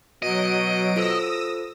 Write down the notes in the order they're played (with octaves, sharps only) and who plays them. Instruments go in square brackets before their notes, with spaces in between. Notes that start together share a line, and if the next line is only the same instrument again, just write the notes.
[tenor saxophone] B2 [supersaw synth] F#3 D7 [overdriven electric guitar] D#5
[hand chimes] F4 A4 C5 [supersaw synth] D#6 E6 A#6